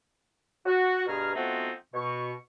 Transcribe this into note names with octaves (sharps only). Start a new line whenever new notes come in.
F#4
G2 B2 G#4 A#5 F6
F3 A3 B3 C4 D#4 F#4
B2 C#6